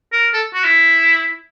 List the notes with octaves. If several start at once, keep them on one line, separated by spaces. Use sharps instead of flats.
A#4
A4
F#4
E4